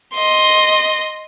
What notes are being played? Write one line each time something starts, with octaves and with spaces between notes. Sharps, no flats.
D#5 C6